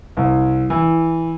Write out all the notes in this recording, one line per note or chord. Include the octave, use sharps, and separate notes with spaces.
C2
E3